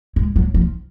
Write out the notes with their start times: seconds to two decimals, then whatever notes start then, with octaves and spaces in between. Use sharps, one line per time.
0.16 G#3
0.36 F#3
0.54 F3